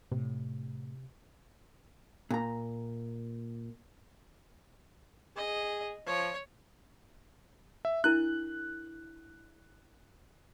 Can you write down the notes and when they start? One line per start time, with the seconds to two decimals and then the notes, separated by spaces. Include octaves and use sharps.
0.11 A2 C3
2.30 A#2 A#5
5.36 G#4 D#5
6.07 F3 C#5
7.85 E5
8.04 D4 E4 A#4 F#6